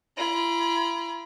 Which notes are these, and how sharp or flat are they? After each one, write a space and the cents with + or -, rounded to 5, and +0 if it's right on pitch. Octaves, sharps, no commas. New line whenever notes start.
E4 +45 B5 -45